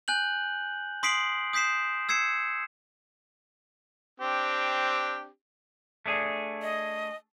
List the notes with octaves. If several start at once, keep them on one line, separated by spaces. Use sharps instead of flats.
G#5 F#6 G6 F#7
C6 D#6 B6 C7 D7 F#7
D#6 G6 B6 C7 E7
E6 G#6 C7 C#7 E7
C4 D4 G4
A3 D4 G#4
D#5